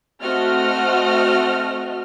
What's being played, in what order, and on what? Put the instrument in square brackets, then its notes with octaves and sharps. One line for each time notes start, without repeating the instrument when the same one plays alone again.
[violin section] A3 C4 F#4 D#5 F6